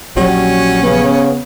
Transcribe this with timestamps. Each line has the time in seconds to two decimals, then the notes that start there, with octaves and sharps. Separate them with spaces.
0.17 A#1 F#3 G3 C#4 F#4
0.83 C#3 B3